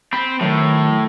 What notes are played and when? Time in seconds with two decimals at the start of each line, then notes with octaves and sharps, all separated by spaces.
0.13 C4 B5
0.41 A2 D#3 F#3